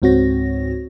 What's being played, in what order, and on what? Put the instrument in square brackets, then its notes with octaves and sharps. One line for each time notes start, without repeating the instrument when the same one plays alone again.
[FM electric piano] C#2 G#2 C4 F#4 C#5 A#6